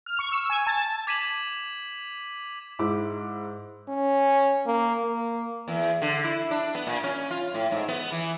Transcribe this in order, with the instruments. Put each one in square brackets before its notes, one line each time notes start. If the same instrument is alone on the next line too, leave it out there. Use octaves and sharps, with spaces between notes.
[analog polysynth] F6
C#6
E6
G#5
A5
[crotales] D6 G#6 B6 D#7 E7 F#7
[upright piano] G#2 E4 D6
[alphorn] C#4
A#3
A#3
[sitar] E2
D3
E4
D4
B3
A#2
C#4
F4
A2
G#2
B3
E3